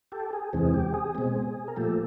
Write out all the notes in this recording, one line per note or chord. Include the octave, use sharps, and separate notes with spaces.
G4 A4
G#4
E2 C3 E3 G#3 C4 G#4
G4
G#4
B2 G#3 C4
A#4
A#2 F3 A3 G4 A4